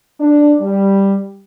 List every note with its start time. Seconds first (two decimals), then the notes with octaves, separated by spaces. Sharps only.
0.20 D4
0.60 G3